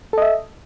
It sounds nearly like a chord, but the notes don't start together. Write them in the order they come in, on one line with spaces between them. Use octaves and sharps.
A4 D#5 E5